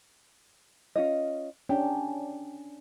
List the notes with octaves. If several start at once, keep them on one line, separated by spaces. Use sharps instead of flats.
C#4 F4 D#5
C#4 D4 G4